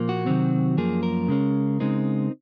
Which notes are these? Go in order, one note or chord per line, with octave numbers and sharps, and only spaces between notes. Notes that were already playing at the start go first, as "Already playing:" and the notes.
Already playing: A#2 F3 A#3
F#4
C3 D#3 F#3 C4
F#2 F3 A#3 G#4
A#4
C#3 G#3 C#4
C#3 G#3 C4 D#4